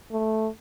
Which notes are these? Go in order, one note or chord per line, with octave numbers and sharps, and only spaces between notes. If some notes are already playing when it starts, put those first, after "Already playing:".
A3